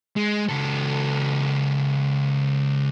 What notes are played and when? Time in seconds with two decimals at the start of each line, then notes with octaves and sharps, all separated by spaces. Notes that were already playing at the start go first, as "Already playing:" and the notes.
0.16 G#3
0.49 C#2 A4